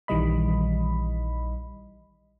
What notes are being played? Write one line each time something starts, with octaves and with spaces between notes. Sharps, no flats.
A#1 D#3 E3 G3 D#5 B5